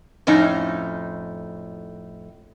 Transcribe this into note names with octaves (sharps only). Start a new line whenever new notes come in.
F2 A2 C#4 D#4